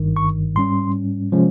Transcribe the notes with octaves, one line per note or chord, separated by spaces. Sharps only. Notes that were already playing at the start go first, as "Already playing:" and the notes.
Already playing: G1 G2 D#3
C#6
G#2 G3 C#4 C6
C3 F3 G#3 C#4